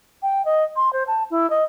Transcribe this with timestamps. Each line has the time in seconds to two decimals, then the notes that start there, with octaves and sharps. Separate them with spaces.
0.22 G5
0.45 D#5
0.76 C6
0.93 C5
1.07 A5
1.31 E4
1.50 D#5